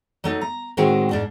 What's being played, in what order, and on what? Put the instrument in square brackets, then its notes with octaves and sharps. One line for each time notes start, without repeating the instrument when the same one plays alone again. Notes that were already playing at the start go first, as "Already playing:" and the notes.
[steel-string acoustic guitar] F#3 A3 D#4
A#5
A2 D#3 G#3 C4 F#4
G#2 D4